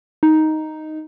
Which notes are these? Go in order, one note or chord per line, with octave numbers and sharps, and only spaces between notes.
D#4